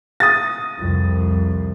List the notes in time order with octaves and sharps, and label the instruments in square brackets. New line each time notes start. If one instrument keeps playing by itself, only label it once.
[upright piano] D#6 A6
[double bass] C2 F2